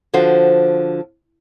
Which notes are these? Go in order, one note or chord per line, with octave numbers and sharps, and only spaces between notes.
D3 F3 F#4 C5